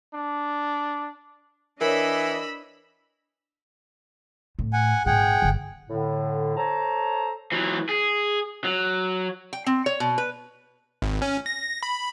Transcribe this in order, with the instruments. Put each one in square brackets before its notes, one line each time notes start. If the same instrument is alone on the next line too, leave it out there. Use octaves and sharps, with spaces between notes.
[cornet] D4
[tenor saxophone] E3 [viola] D4 D#5 [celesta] A#4 C#5 [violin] B5 E6
[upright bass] A2
[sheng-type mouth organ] F#5 G#5
[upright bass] G#1 A#2 [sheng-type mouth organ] G#4 F#5 G5
[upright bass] G1 D3
[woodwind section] A2 D3
A4 C5 C#5 A5 A#5
[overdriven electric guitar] E3 F#3
G#4
F#3
[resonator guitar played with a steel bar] G5
C4
C#5
B2
B4
[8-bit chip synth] G#1
C#4
A#6
B5